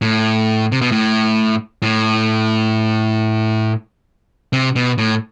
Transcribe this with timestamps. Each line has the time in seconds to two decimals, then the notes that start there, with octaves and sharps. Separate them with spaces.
0.02 A2
0.72 C3
0.81 B2
0.92 A2
1.82 A2
4.53 C3
4.76 B2
4.98 A2